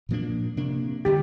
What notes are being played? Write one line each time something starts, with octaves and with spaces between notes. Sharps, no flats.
A#2 F3 A#3 D4
C3 A#3 D4
D3 G3 G4